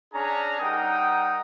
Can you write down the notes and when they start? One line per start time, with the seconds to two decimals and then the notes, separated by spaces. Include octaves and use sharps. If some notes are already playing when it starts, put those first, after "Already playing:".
0.13 C#4 D4 G#4 G#5 A#5
0.61 G3 D#4 A#4 F#5 G5 D#6